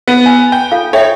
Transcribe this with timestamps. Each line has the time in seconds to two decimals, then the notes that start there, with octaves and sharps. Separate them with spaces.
0.08 B3
0.26 G#5
0.52 G5
0.71 F4 A4 F5
0.93 A4 C#5 E5 G5